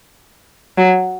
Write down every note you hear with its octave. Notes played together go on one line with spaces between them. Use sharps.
F#3